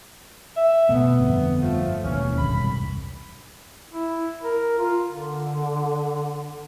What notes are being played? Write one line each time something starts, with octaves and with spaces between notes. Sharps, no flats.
E5
B2 A3 B3
G1 F2
F3 A3
E1 D#2 E3 C#4
E1 C2 G2 B5
E4
A#4
F4
D3